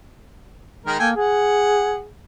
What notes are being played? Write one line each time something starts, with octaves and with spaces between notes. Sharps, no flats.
D#3 G#3 A#4
A#3 A4 G5 G#5
G#4 F#5